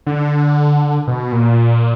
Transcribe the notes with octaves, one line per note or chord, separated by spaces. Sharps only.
D3
B2
A#2